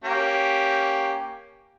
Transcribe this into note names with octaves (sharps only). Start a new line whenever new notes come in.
A#3 C#4 G4